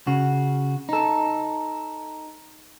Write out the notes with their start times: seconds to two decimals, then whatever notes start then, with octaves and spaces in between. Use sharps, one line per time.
0.07 C#3 F#4
0.89 D#4 A4